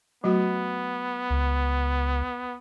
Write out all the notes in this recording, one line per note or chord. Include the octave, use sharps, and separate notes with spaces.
F#3 A3 B3 F#4
C#2